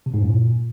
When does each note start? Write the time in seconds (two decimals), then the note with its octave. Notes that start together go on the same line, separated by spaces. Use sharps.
0.06 C3
0.14 G#2
0.21 F#2
0.29 A#2